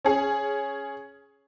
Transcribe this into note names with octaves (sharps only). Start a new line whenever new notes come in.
C#4 G#4